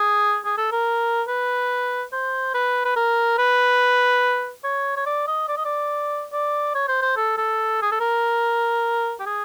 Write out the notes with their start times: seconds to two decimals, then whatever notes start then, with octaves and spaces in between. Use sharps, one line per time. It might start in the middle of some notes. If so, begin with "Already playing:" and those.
Already playing: G#4
0.45 G#4
0.58 A4
0.72 A#4
1.28 B4
2.13 C5
2.54 B4
2.85 B4
2.96 A#4
3.38 B4
4.64 C#5
4.97 C#5
5.06 D5
5.27 D#5
5.48 D5
5.57 D#5
5.65 D5
6.32 D5
6.75 C#5
6.88 C5
7.02 C5
7.16 A4
7.37 A4
7.82 G#4
7.92 A4
8.00 A#4
9.20 G4
9.26 G#4